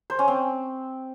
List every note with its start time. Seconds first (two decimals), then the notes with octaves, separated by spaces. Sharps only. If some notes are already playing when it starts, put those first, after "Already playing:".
0.10 C5
0.19 C#4
0.28 C4